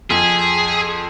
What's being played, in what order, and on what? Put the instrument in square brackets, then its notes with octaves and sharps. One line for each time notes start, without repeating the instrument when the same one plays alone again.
[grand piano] F2 [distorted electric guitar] G#4